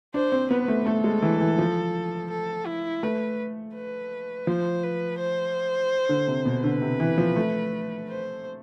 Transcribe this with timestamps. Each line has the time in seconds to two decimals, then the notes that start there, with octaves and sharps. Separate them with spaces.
0.14 D4 C5
0.32 C4
0.51 B3 B4
0.68 A3
0.86 A3 A4
1.04 G#3
1.22 E3
1.41 E3
1.58 F3
2.31 A4
2.67 E4
3.03 A3 B4
3.75 B4
4.47 F3 C5
4.83 B4
5.19 C5
6.09 D3
6.27 C3
6.45 B2
6.64 D3 B4
6.82 C3
7.00 E3
7.18 F3
7.36 A3
8.09 C5